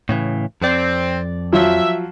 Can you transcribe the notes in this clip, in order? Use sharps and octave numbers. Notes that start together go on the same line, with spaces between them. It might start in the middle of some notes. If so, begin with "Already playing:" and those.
A2 C#3 E3
F2 C4 D5
F3 F#3 E5